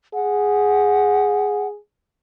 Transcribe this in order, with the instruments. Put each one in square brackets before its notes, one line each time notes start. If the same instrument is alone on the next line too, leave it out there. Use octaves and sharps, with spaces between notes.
[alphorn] G#4 [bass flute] F#5